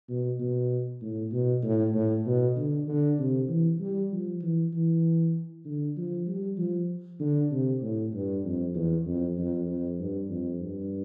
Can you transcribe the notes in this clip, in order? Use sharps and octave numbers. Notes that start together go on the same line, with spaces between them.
B2
B2
A2
B2
A2
A2
B2
D3
D3
C3
E3
G3
F3
E3
E3
D3
F3
G3
F3
D3
C3
A2
G2
F2
E2
F2
F2
F2
G2
F2
G2